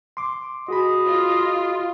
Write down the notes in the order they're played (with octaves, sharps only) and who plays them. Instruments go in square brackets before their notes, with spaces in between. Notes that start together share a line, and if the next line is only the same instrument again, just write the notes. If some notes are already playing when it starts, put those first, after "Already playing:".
[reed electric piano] C6 D6
[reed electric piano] F#4 G#4 B5 [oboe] D#5
[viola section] F4